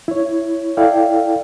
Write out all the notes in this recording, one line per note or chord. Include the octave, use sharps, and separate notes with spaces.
E4 C#5
E4 A4 D5 F5 G5